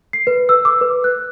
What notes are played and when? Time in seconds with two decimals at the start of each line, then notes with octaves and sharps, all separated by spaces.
0.13 C7
0.27 B4
0.49 E6
0.65 D6
0.81 B4
1.04 F#6